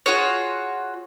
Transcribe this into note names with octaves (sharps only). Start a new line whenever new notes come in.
F4 F#4 G#4 C#5